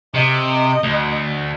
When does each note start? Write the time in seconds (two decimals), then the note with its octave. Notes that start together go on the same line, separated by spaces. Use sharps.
0.15 C3 D#5
0.83 D2